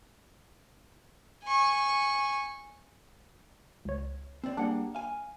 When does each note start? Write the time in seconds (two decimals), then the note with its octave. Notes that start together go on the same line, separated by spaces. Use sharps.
1.44 G#5 C#6
3.85 C#2 C#5
4.44 C4 D5
4.57 G3 A#3 D4 G#4 F#5
4.95 F5 G#5